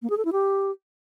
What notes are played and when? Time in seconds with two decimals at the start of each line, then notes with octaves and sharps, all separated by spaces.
0.02 A#3
0.10 G#4
0.17 A4
0.25 E4
0.32 G4